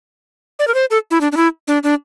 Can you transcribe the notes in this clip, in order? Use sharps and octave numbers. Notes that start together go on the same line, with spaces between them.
D5
A#4
C5
A4
E4
D4
D4
E4
D4
D4